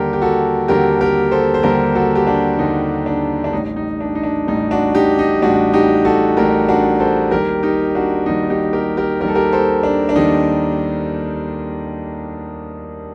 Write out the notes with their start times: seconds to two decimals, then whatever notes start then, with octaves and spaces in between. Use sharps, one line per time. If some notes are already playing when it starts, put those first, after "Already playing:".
Already playing: D#2 D3 G3 G4 A#4
0.13 G4
0.22 F#4 A4
0.68 D#2 D3 G3 G4 A#4
1.01 G4 A#4
1.31 A4 C5
1.54 C5
1.63 D#2 D3 G3 G4 A#4
1.95 F#4 A4
2.15 G4
2.27 D4 F#4
2.58 D#2 D3 G3 D#4
3.06 D4
3.44 D4
3.52 A1 A2 G3 D#4
3.76 D#4
4.01 D4
4.15 D#4
4.23 D4
4.47 A1 A2 G3 D#4
4.71 D4 F#4
4.95 D#4 G4
5.19 D#4
5.42 A1 A2 G3 D4 F#4
5.73 D#4 G4
6.05 F#4 A4
6.37 A1 A2 G3 G4 A#4
6.69 D4 F#4
7.00 A4 C5
7.31 D#2 D#3 G3 G4 A#4
7.63 D#4 G4
7.95 D4 F#4
8.26 D#2 D#3 G3 D#4
8.50 D#4 G4
8.73 G4 A#4
8.97 G4 A#4
9.21 D#2 A#4
9.23 D#3 G3 A4
9.35 G4 A#4
9.52 A4 C5
9.83 D4
10.09 D4
10.15 D#2 D#3 G3 D#4